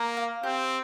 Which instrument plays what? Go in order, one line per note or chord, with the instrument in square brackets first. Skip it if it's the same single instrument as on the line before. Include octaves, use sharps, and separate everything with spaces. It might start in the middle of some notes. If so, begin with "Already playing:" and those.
Already playing: [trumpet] A#3 [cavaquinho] A#5
[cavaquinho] F5
[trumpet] C4 [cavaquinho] G4